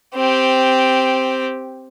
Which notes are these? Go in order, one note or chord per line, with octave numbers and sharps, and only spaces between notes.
C4 G4